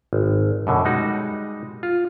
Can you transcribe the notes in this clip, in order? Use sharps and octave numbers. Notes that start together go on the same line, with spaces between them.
G#1
F#2 B2 D3
G3 G#3 D#4 F#4
F4